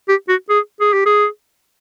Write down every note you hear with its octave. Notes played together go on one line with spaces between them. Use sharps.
G4
F#4
G#4
G#4
G4
G#4